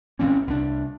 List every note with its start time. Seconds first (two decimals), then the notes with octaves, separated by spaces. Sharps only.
0.19 A1 E3 C4 C#4
0.47 C2 D4